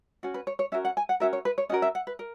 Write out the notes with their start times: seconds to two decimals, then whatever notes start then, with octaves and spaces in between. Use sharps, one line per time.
0.23 C#4 F#4
0.34 B4
0.47 C#5
0.59 C#5
0.72 C#4 F#4 A#4 E5
0.85 F#5
0.97 G#5
1.09 F#5
1.20 C#4 F#4 A#4 E5
1.33 C#5
1.45 B4
1.58 C#5
1.69 C#4 F#4 A#4 D#5
1.82 E5
1.95 F#5
2.07 B4
2.19 A#4